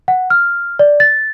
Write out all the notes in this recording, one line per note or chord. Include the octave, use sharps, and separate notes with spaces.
F#5
F6
D5
A6